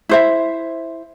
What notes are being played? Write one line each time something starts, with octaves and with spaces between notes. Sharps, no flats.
E4 C5 E5